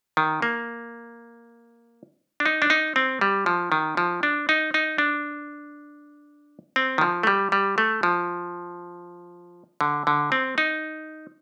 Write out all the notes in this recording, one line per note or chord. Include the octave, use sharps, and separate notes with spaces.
D#3
A#3
D4
D#4
D4
D#4
C4
G3
F3
D#3
F3
D4
D#4
D#4
D4
C4
D#3
F3
A3
G3
G3
A3
F3
D3
D3
C4
D#4